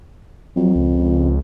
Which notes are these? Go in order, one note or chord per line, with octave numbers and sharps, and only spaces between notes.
F2 F#3
C#2